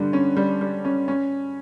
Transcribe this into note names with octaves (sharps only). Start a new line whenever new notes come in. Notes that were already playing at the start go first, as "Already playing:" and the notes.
Already playing: G2 D3 G3
C#4
G3
G3
C#4
C#4